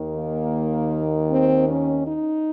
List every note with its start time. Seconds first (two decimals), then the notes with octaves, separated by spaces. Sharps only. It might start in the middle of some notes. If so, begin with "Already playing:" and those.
Already playing: D#2 D#3
0.15 A#3
1.28 C4
1.67 C#4
2.05 D#4